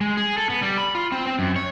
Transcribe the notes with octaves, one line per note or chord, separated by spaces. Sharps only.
G#3
G#4
A4
B3
G3
B5
F4
C4
C4
F#2
C#5